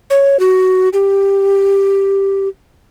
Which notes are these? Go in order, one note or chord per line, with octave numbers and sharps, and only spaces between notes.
C#5
F#4
G4